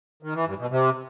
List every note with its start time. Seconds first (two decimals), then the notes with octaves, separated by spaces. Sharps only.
0.23 D#3
0.35 E3
0.47 G2
0.59 B2
0.71 C3